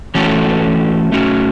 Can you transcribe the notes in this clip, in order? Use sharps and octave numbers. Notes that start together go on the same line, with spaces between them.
E3 A3 C#4 F#4 A4
A3 C#4 F#4